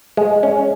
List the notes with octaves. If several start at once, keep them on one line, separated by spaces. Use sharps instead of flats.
G#3
C#4